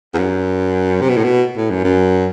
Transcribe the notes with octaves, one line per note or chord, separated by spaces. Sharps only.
E2
F#2
C3
B2
A2
B2
A2
F#2
F#2